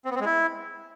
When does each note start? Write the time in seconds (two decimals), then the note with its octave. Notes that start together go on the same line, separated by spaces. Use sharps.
0.05 C4
0.10 B3
0.15 C4
0.20 G#3
0.25 E4